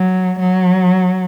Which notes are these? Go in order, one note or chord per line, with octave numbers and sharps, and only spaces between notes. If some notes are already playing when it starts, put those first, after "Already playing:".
Already playing: F#3
F#3